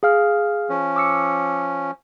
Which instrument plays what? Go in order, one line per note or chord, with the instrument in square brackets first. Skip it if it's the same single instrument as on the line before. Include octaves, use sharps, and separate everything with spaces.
[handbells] G#4 F5 F6
[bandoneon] F3 C#4
[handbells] D6 E6 C#7